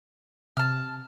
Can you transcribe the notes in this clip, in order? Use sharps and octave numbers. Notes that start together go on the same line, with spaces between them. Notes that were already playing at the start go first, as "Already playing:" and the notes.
C3 A5 F6